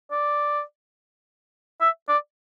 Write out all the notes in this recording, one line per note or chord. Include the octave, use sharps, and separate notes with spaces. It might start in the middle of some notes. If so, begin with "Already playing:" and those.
D5
E5
D5